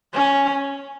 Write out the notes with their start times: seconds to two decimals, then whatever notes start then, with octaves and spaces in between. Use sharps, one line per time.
0.14 C#4